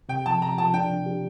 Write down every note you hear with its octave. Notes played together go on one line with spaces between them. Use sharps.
C3 G5
F3 A5
C3 A#5
F3 A5
D4 G5
C3
G4